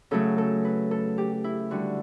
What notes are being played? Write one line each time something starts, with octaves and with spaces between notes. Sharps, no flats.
C#3 F#3 A3 A4
A4
B4
A4
G4
E4
D3 G3 F#4